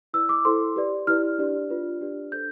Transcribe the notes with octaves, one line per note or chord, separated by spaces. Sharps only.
E4 B4 D5 E6
D6
E4 A4 C5 C6
G4 B4 D5
E4 G4 B4 D5 F6
D4 G4 D5
D4 F4 B4 D5
D4 G4 B4 D5
D4 A4 C5 G6